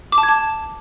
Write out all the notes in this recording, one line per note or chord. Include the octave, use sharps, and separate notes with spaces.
D6
A5
G#6
A5